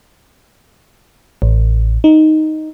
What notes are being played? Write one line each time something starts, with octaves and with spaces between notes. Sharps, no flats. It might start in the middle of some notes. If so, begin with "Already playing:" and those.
A1
D#4